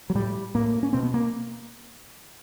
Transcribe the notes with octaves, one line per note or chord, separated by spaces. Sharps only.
F#3
A2 G3
A2 A#3
C#4
B2 C4
B3
A#3